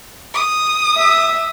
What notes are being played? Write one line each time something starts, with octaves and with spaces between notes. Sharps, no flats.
D#6
E5